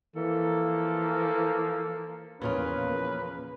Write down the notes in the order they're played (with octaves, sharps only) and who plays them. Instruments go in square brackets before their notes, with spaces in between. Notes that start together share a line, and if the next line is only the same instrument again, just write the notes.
[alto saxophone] E3 [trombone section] F3 A#3 [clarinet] A4
[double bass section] E2 F3 A#3 [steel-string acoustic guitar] A#2 C#3 F4 [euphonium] C#4 [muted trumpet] B4